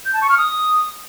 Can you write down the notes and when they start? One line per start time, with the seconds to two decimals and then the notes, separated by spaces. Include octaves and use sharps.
0.05 G6
0.13 A5
0.22 C#6
0.30 F6
0.38 D#6